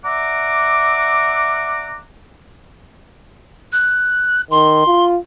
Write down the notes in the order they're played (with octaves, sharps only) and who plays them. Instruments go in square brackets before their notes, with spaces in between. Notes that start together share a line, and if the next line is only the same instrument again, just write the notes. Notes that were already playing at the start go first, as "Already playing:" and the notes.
[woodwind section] D5 E5 F#5 A#5 D6
[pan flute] F#6
[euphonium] D#3 [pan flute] C6
[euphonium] F4